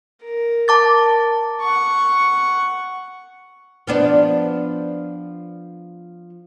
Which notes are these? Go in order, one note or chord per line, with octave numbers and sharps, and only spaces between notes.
A#4
A5 D6 A6
F#5 C#6
F3 B3 D4